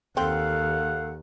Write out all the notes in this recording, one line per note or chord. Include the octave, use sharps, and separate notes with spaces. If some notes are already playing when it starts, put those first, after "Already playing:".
D#2 C4 A4 F5 F#5